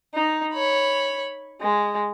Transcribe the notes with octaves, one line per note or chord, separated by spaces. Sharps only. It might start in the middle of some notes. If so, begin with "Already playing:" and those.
D#4
C#5 B5
G#3